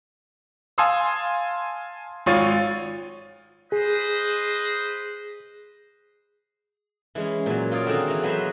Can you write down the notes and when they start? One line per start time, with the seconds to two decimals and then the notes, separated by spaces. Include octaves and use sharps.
0.78 F5 G#5 A5 C6 D#6 E6
2.26 G#1 F4 C#5 A6 D#7
3.72 G#4 B4 C5 D#5
7.15 E3 G#3 C#4
7.46 A#2 F#3
7.72 F4 G#4 C#5 D5
7.87 D3 D#3 A#3 C4 F#4 G#4
8.08 E3 A#5
8.23 F#3 B3 F#4 B4 C5 E5